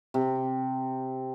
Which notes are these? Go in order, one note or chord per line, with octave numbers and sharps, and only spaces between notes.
C3